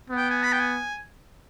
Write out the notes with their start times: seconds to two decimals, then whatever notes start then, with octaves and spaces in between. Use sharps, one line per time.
0.10 B3
0.17 G5
0.30 G#5
0.43 B5
0.52 G5
0.60 G#5